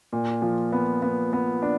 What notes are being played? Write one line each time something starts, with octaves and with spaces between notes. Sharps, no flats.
A#2
F3
B3
B3
B3
D4